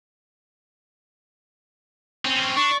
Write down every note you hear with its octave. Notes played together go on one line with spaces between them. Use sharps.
C4 C#4
D4 C#6